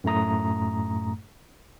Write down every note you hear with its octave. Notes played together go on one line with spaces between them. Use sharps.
F#2 A2 A3 A#5 D#6